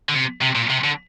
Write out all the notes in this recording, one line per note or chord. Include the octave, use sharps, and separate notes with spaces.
D3
C3
C3
A#2
C3
D3